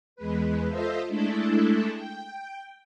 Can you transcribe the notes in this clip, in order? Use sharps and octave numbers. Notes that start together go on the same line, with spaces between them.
E2 G#3 B4
F4 A4 C5 D#5 E5
G#3 A3 D4 E4 A4
G5